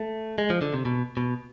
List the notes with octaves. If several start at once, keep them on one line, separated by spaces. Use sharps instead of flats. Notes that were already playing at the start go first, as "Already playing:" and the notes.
Already playing: A3
G#3
F3
D3
C3
B2
B2